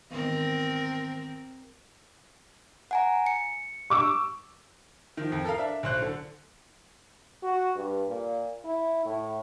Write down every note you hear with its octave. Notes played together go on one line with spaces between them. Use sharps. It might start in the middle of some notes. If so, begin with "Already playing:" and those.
E2 G#2 D#3 C4 A#4
F#5 G#5 A#5
C#7
C#6 D6 E6
D#3 F3
F2
A4 A#4 F5
D4 E5
B1 C5 F#6
D3
F#4
G2
A#2
E4
A2